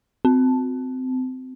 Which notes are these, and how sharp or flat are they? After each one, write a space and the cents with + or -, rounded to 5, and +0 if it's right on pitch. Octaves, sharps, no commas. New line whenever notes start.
C4 -25